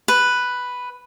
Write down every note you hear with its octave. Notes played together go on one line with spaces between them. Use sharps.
B4